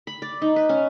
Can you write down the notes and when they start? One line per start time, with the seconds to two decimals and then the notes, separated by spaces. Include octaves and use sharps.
0.07 B5
0.22 D5
0.42 D#4
0.56 B4
0.69 C#4